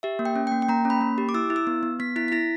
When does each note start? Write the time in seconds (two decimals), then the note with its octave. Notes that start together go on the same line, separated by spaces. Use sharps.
0.03 G4 E5
0.19 A#3
0.25 G5
0.36 C#4
0.47 A#3 G5
0.62 G5
0.69 A#3 A#5
0.85 C#4
0.90 B5
1.01 A#3
1.18 G4
1.29 D6
1.34 E4 E6
1.50 E4
1.56 E6
1.67 B3
1.83 B3
2.00 B3 B6
2.16 E4 B6
2.28 B6
2.32 E4 A#6